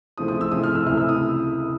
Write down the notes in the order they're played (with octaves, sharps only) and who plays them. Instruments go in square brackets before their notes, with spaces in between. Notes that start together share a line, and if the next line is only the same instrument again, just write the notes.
[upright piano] C#3 F3 A3 C4 E4 D#6
D#6
E6
C#3 F3 A3 C4 E4 D#6
F6
E6
C#2 C3 E3 A3 F6
E6
D#6